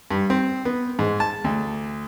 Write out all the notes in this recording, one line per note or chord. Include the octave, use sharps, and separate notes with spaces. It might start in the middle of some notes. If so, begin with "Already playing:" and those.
G2
C4
B3
G#2
A5
D2